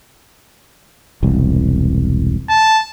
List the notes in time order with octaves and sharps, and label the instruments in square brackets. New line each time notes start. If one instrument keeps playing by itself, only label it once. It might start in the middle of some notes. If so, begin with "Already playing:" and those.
[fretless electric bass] E1 C2
[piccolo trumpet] A5